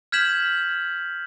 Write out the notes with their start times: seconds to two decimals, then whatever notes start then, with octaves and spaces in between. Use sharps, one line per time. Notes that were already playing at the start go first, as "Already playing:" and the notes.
0.12 F6 G6 G#6 B6 E7 F#7